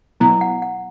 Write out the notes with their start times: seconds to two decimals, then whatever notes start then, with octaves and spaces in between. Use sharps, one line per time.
0.20 B2 F#3 B3 E4 A#5
0.41 F#5
0.62 F#5